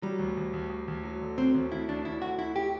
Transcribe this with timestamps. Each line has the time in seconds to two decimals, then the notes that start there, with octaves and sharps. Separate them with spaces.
0.02 F#3 G3
0.19 D2
0.37 D2
0.53 D2
0.70 D2
0.88 D2
1.03 F#3
1.21 D3
1.38 F#3 C4
1.55 D2
1.72 D2 E4
1.88 D2 D4
2.05 D2 E4
2.22 D3 F#4
2.38 D2 E4
2.56 G4